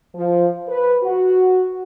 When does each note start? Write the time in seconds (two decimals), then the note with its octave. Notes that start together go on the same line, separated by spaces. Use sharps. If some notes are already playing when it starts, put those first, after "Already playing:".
0.15 F3
0.68 B4
1.03 F#4